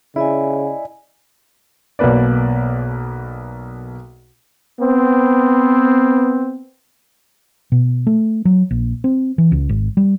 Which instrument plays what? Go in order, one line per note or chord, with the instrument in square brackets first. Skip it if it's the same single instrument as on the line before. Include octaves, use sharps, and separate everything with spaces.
[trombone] C#3 [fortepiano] E4 [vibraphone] D5 D#5 G#5
[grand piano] B1 B2 A#3 B4 D5
[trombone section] B3 C4
[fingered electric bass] B2
A3
F#3
A#1
C4
E3
C#2
G#1
G3